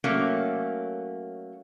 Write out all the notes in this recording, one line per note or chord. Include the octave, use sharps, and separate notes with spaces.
F#3 A3 A#3 C#4